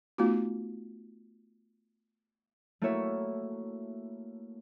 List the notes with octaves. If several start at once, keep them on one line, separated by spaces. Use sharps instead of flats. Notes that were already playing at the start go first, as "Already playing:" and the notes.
A3 B3 D#4 F4 F#4
A3 A#3 E4 F#4 C#5 E5